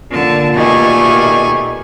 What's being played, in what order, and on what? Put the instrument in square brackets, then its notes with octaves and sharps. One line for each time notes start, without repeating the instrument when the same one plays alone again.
[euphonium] A#2 [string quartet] D3 A5
[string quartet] B2 G3 A3 [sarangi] D#3 [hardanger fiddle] G#5 C#6